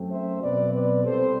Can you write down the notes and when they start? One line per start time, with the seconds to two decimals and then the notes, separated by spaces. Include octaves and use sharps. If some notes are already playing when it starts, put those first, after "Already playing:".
Already playing: F#2 F#3 A3 C4
0.11 C5 E5
0.42 B2 F#3 C4 B4 D5
0.74 B4 D5
1.04 C2 C3 G3 C4 A4 C5